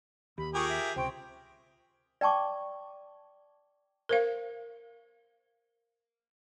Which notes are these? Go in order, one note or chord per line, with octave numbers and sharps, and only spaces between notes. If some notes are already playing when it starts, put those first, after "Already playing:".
D#2 G4 B5
F4 G4 G#4 A#4 C#6 D#6
E5
C#2 C3 C5 G5 C6 C#6
D5 G5 A5 C#6 D6
A#4 C5 F5